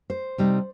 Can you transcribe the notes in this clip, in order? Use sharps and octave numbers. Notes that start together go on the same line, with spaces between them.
C5
C3 G3 D#4